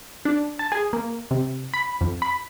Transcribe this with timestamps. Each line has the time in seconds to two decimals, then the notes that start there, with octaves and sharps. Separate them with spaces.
0.25 D4
0.59 A5
0.72 G#4
0.93 A#3
1.31 C3
1.74 B5
2.01 F2
2.22 B5